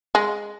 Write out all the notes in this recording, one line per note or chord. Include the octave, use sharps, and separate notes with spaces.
G#3